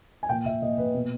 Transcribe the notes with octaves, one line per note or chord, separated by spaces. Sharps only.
G#5
A#2 G5
A#2 E5
A#2 D#5
A#2 B4
B2